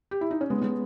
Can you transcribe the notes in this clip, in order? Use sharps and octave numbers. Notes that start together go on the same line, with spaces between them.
G4
E4
D#4
C#4
G#3 B3
G#3